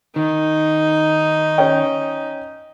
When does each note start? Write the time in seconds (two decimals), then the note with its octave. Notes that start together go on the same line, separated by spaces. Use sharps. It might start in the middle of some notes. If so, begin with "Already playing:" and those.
0.16 D#3 D#4
1.58 C#4 G5